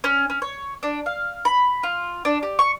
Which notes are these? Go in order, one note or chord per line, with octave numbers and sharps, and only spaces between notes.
C#4
C#4
C#5
D4
F5
B5
F4
D4
G4
C#6